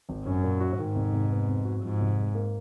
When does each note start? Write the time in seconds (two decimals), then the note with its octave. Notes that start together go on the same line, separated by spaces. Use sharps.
0.09 G#1
0.25 F#2 C#4
0.43 A#2
0.61 F#4
0.78 G#2 D#3
0.96 F1
1.13 F1
1.31 B3
1.48 F2
1.65 F#4
1.83 G#2 F3
2.00 F1
2.18 G#3
2.35 A#3